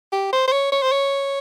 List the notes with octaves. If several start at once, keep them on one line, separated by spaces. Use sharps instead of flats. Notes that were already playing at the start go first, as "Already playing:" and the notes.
G4
C5
C5
C#5
C#5
C5
C#5